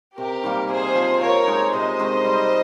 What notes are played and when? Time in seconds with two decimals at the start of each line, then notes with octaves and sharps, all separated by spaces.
0.17 C3 G4 A#4
0.43 D#3 G3 A#3
0.69 C3 G#4 C5
0.95 F3 C4
1.21 F3 A#4 C#5
1.47 G#3 D#4
1.73 C3 C5 D#5
1.99 D#3 G#3 C4
2.25 G3